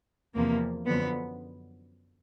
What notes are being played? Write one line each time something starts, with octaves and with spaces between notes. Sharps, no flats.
E2 C3 F3 A#3
F#2 D3 F3 B3